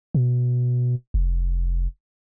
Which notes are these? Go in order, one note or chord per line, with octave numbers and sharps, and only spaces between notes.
B2
F1